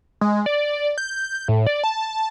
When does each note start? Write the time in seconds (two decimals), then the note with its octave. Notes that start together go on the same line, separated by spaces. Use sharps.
0.21 G#3
0.46 D5
0.98 G6
1.48 A2
1.67 D5
1.84 A5